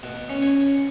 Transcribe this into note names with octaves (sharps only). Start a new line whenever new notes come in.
B2
C#4
C#5